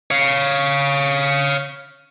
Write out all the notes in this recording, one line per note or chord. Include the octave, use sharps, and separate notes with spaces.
C#5 F5